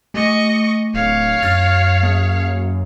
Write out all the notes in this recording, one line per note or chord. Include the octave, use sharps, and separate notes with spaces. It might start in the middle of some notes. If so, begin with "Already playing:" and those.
A3 D#5 C#6
D1 C#5 F5
F#2 F6 A6
A#3